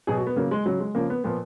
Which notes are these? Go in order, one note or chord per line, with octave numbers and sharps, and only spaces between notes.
B2 F#3 G#4
F#4
B3
C#3 F#3 A#3
G#3
C#3 F#3
G#3
C#3 F3 A#3
B3
A#2 F3 B3